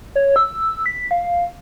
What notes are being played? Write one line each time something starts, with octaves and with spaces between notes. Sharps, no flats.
C#5
E6
B6
F5